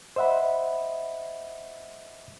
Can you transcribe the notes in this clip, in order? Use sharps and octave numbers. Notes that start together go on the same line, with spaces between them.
C5 D#5 E5 F#5 B5